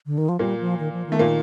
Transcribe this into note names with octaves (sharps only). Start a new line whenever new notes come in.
D3
D#3
F3
A#2 G3 A#3
F3
D#3
F3
D#3
A3
A#2 A#3